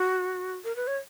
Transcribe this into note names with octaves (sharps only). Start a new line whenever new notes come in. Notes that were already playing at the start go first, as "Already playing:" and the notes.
Already playing: F#4
A#4
B4
C#5